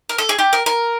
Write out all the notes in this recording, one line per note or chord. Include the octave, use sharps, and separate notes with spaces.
A#4
A4
G#4
G4
A#4
A#4